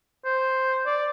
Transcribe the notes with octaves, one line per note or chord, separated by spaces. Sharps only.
C5
D5